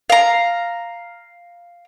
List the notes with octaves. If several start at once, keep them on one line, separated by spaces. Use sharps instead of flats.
F5 A#5